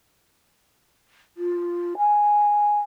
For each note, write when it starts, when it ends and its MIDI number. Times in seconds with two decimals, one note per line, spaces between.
1.37 1.94 65
1.98 2.79 80